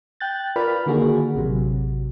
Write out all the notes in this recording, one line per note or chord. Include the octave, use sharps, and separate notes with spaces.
G5 F#6 G6 A6
F4 A#4 B4 D5 B5 F6
D3 D#3 A#3 F#4 G#4
A1 C3 F#3